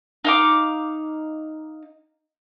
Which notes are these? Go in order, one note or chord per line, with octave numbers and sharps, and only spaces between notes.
D#4 F5 D6